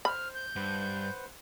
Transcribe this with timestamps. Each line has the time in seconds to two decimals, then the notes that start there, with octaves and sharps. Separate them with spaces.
0.05 C5 B5 F6
0.34 G6
0.56 G2 B4 C5 F#5